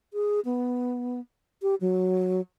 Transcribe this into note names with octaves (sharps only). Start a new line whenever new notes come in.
G#4
B3
G4
F#3